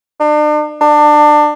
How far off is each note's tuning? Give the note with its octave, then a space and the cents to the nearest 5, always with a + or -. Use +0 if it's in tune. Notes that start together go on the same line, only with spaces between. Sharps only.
D4 +40
D4 +25